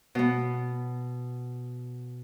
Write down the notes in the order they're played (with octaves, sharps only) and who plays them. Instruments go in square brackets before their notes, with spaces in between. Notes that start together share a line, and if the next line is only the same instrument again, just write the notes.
[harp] B2 B3